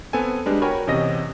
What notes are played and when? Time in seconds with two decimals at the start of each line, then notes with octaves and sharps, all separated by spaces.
0.13 B3 C4 A4 G#5
0.46 G3 G#3 D4 B4
0.62 F#4 A#4 C#5 G5 G#5 B5
0.87 E2 C3 C#4 D#5 A#6